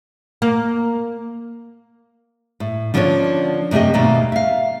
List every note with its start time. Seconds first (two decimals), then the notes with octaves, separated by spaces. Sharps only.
0.42 A#3
2.60 A2
2.94 D3 F3 A#3 C#4 D4 C#5
3.71 F#2 C3 A3 G4 D#5
3.94 D#2 B2 A3 A#3 E5
4.32 E5 F5